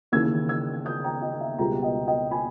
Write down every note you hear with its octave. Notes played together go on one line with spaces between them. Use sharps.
D#2 C#3 E3 E6 G#6
E6 G#6
D#6 G6
G5 A#5
D#5
E5
C#2 B2 G3 B3 G5 A#5
D#5 G5
D#5 G5
G#5 B5